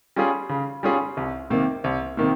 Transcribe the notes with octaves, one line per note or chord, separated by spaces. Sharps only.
G3 C#4 F4 G#4
C#3
G3 C#4 F4 G#4
C2
C3 D#3 A#3
C2
C3 D#3 A#3